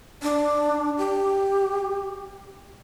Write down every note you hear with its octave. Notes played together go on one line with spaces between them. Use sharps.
D4
G4